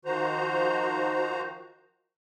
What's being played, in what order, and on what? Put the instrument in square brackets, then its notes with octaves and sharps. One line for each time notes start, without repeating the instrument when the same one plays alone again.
[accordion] D#3 F3 F#4 C5 A#5